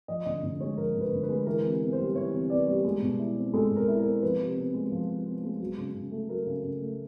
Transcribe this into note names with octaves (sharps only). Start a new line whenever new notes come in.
F3 D#5
D3 D#5
D3
G#3 C#5
F3 A#4
D3
B4
D3
B4
G#3
E3 A#4
C3
B3
C5
G3
E3 C#5
C3
B3 D5
G3
G#3
B2
E4
C4
G#3 A4
B2
A#4
E4
A#4
C4
F3 B4
C3
B3
G#3
F3
C3
B3
G#3
F#3
C#3
C#3
A3
F#3 A#4
C#3
C#3
A3